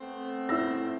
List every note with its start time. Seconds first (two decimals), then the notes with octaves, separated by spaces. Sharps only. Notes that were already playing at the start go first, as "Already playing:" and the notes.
0.01 A3 B3 C4
0.49 E4 E6 A#6